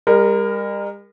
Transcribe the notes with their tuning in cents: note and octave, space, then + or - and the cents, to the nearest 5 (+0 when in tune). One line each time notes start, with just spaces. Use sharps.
G3 +45 A#4 +0